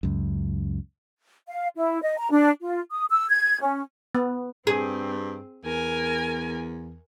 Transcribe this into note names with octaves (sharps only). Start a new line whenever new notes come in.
C#2 F#2
F5
E4
D#5
A#5
D4
F4
D#6
E6
G#6
C#4
B3
G2 C4 G#4
E2 A#4 G#5